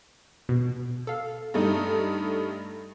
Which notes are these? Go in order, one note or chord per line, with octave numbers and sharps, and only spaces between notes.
B2
A4 F5
G2 A3 D#4